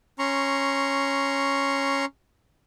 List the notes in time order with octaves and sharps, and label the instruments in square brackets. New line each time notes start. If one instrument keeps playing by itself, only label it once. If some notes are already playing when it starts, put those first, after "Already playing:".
[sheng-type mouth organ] C#4 A#5 C6 C#6